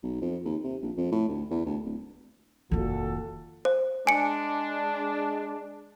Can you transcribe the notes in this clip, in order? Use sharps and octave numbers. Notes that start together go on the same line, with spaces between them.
B1
F2
D#2
C3
A#1
F2
A2
D2
E2
D2
D1
F1 A#2 D#3 F#4 A4
C5
G#3 D4 G#5 C#7